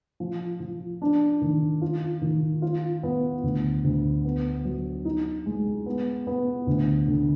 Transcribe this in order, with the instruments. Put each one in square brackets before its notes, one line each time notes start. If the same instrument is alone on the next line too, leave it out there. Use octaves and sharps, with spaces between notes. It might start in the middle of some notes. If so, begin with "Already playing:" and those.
[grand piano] F3
F3
D4
D#3
F4
D#3
F4
B3
D2
D2
B3
F#3
D#4
G#3
B3
B3
D2
D3